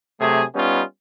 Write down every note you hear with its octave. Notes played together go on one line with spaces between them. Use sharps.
C3 F#3 A3 G#4
G3 B3 C#4 D#4 F4